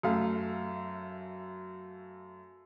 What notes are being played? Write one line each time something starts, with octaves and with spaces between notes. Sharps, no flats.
F#2 A3 F5